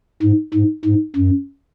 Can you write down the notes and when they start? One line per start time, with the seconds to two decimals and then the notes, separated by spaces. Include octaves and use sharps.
0.22 G#2
0.54 G#2
0.85 G#2
1.16 F#2